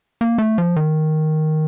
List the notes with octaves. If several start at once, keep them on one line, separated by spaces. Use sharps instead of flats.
A#3
A3
F3
D#3